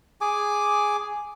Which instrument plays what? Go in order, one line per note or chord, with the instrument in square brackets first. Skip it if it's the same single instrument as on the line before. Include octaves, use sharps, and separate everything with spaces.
[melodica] G#4 G#5 D6